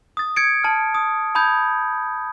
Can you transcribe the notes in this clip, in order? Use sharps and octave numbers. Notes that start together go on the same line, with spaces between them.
D#6 A6
G#6 A6 C#7 D7
A5 F6
D#6
A5 B5 D#6 G6 G#6